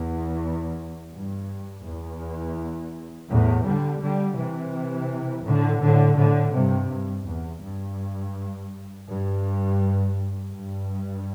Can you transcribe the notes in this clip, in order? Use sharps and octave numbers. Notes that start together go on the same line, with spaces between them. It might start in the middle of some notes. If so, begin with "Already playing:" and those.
Already playing: E2
G2
E2
E2 A2
D3 G3
D3 G3
C3 E3
A2 D3
A2 D3
A2 D3
G2 C3
G2
E2
G2
G2
G2